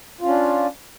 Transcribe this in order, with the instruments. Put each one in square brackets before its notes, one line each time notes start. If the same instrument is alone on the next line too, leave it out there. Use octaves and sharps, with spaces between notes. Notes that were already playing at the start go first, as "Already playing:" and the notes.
[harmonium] F4
C#4
D4